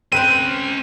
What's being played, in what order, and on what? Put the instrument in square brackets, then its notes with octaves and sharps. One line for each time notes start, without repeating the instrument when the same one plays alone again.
[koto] C4 B4 C5 [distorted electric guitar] C#4 C6 [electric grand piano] D#7